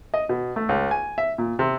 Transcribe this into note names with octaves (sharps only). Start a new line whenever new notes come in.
D#5
B2
A3
C#2
G#5
E5
A#2
C3